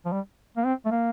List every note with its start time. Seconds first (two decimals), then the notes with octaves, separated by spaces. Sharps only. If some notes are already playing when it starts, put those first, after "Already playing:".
0.05 F3
0.12 G3
0.57 A#3
0.65 C4
0.85 A3
0.91 A#3